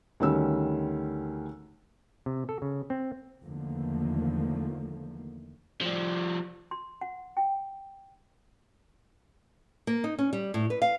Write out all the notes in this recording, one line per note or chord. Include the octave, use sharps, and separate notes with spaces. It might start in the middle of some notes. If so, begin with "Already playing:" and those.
D2 D#3 G3 C#4 E6
C3
A4
C#3
C4
E2 D3 D#3 F3 A3 A#3
F3 G3
C6
F#5
G5
A#3
D#4
C#4
G3
A2
B4
F5